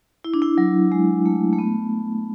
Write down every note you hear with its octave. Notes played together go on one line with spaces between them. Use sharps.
E4
D4
E4
F#3
G#3
A3
A3
B3